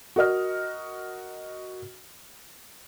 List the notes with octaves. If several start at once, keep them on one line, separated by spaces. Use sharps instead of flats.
F#4 A#4 D#5 F6